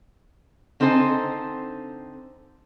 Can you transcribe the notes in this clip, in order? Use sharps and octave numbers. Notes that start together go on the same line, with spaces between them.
D3 C4 D#4 A4 C5 G#5